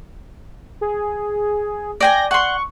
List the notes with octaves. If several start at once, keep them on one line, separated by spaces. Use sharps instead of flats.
G#4
D5 G5 G#5 A#6
F#5 C6 C#6